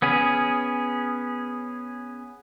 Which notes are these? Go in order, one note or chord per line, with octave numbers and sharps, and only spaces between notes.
B3 C#4 G#4